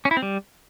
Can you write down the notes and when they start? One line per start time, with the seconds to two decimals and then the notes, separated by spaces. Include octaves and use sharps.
0.05 C#4
0.11 E4
0.17 C4
0.22 G3